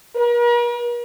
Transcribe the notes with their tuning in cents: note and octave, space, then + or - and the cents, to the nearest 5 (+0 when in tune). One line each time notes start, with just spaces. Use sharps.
A#4 +45